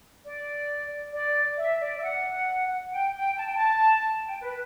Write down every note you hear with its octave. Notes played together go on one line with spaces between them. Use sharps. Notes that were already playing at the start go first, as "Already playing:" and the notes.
D5
D5
E5
D5
E5
F#5
G5
G5
A5
G5
A5
G5
B4